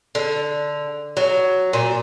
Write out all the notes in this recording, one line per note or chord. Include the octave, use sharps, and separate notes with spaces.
D3
F#3
A#2